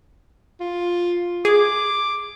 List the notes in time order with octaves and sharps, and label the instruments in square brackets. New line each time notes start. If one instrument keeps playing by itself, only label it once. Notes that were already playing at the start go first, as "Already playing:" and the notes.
[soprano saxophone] F4
[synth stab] G#4 [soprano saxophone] D6